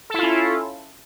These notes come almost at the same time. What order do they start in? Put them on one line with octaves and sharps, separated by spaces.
A4 E4 F4 C#4